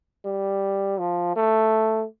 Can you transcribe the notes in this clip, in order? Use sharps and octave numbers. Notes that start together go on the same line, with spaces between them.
G3
F3
A3